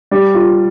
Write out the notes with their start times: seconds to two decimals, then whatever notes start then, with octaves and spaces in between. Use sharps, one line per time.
0.11 G3
0.34 F4